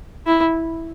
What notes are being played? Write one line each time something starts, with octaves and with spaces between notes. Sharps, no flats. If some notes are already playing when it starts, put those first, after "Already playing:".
E4